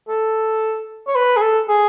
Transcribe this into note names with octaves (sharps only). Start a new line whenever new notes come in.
A4
C#5
B4
G#4
A4
G#4